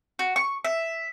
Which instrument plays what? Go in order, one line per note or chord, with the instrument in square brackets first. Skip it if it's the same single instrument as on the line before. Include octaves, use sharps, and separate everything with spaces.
[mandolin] F#4
C#6
E5